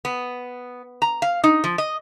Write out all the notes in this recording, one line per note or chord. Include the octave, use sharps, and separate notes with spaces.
B3
A#5
F5
D#4
F3
D#5